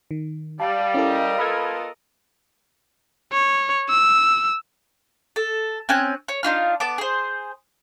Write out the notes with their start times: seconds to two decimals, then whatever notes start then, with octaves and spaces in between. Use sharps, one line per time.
0.11 D#3
0.60 G3 D5 F5 A5
0.94 C#4 E4 A4 A#4 D#5
1.39 B3 F4 A4 B5 F6 G#6
3.33 C#5
3.90 E6
5.36 A4
5.89 C4 C#4 G#5 F#6
6.28 C#5
6.43 D4 D#4 F4 F6
6.80 B3 A5 D6
6.98 G#4 C5